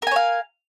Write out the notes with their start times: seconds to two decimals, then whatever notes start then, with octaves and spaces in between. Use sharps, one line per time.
0.02 A#4
0.07 G#5
0.11 C#5
0.16 F5